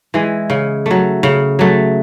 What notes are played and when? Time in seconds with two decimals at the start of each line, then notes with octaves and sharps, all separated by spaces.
0.14 E3 G#3
0.50 C#3
0.86 F#3 A3
1.23 C#3
1.59 F#3 A3